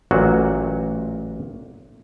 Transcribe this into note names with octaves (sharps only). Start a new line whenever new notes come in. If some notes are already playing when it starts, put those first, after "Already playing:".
A1 A#2 F#3 F#4